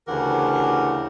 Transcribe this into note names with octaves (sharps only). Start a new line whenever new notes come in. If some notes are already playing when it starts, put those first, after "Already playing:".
D2 C#3 E3 G4 A#4 F#5